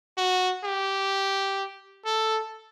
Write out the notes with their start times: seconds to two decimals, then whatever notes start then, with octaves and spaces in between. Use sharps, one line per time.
0.18 F#4
0.65 G4
2.06 A4